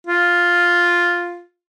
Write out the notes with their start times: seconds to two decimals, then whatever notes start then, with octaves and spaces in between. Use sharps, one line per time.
0.07 F4